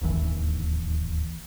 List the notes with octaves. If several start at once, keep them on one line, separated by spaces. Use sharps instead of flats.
D1 G#1 D#2 E3